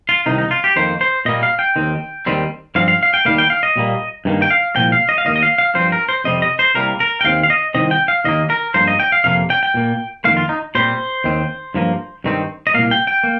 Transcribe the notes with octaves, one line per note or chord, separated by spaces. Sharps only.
F4
C2 C3 D#3 D#4
D#4
F4
G4
F2 D#3 A#3 C5
C5
A#2 G3 A#3 D#5
F5
G5
D#2 D#3 C4
D#2 D#3 G3 C4
G2 F3 C4 F5
F5
F5
G5
D#2 D#3 G3 A#3 F5
G5
F5
D#5
A#2 G3 A#3
G2 D#3 A#3
G5
F5
C2 A#2 F3 G5
F5
D#5
F5
D#2 D#3 A#3 D#5
D#5
F5
F5
G2 F3 C4 C5
A#4
C5
F2 C3 G3 C4 D#5
D#5
C5
C2 C3 G3 A#3 A#4
A#4
G5
D#2 D#3 C4 F5
F5
D#5
C2 C3 D#3 C4 D#5
G5
F5
D#2 D#3 A#3 D#5
A#4
G2 F3 A#3 C5
D#5
G5
F5
F2 C3 F3 A#3 F5
G5
G5
A#2 A#3
F2 D#3 A#3 F5
F4
D#4
A#2 G3 C4 C5
D#2 D#3 C4
G2 F3 A#3
G2 D#3 C4
D#5
C2 A#2 A#3 F5
G5
G5
A#3